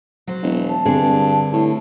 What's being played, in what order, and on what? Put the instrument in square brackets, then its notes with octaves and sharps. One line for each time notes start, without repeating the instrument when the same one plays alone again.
[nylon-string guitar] F#3 C5
[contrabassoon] E1 [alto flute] D#5
[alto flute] A5
[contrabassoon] G2 [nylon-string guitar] D3 C4 G#4
[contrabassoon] A2